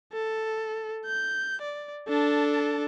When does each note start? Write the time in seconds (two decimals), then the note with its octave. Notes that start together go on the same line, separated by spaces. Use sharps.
0.13 A4
1.06 G6
1.62 D5
2.08 D4 A4